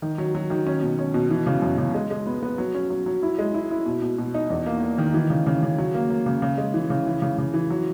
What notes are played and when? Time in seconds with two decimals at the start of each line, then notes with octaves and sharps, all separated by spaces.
0.02 D#3
0.18 F#3
0.35 F#3
0.50 D#3
0.67 C#4
0.82 B2
0.99 C#4
1.14 B2
1.30 E3
1.46 C#3
1.62 F#2
1.78 C#3
1.94 G#3
2.10 G#3
2.27 B3
2.43 B3
2.58 F#3
2.75 C#4
2.90 F#3
3.06 F#3
3.23 E4
3.39 G#3
3.54 E4
3.71 E4
3.86 B2
4.02 B2
4.18 B2
4.34 D#4
4.50 E2
4.66 A#3
4.82 A#3
4.98 D#3
5.14 E3
5.30 C#3
5.47 C#3
5.63 C#3
5.78 F#3
5.94 A#3
6.10 A#3
6.26 C#3
6.42 C#3
6.58 G#3
6.74 E3
6.90 C#3
7.06 E3
7.22 C#3
7.38 C#3
7.54 E3
7.70 F#3